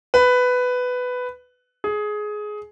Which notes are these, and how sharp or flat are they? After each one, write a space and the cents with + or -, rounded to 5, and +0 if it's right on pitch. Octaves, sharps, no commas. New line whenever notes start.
B4 +10
G#4 +15